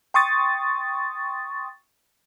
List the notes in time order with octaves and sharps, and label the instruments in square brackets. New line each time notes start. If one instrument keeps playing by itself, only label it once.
[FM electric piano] G5 C6 C#6 D#6 A6